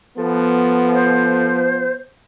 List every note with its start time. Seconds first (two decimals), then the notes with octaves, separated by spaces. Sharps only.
0.18 F3 B3 A4
0.93 C5